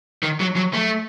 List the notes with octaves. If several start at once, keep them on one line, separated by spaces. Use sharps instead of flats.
D#3
F#3
F#3
A3